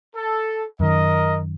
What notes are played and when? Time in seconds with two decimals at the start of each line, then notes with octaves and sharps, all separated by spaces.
0.15 A4
0.80 F#2 D#3 A#4 D#5